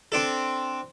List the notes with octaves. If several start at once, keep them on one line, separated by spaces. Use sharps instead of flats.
C4 D4 A4